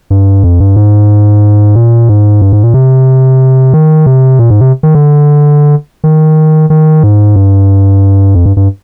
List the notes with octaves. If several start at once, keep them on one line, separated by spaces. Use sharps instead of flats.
G2
F2
G2
G#2
A#2
G#2
G2
G#2
A#2
C3
D#3
C3
A#2
G#2
C3
D#3
D3
D#3
D#3
G#2
G2
F2
G2
G2